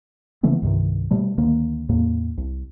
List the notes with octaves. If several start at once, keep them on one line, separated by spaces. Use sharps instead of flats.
C#3 E3 A3 B3
C2 G2 C3 D#3
B2 G3 A3
D2 D#3 A#3
E2 A2 A#3
C2